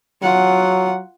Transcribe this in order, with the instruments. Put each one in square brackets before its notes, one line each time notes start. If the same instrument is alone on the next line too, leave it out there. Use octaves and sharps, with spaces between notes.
[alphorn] F#3 [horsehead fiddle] F4 F#5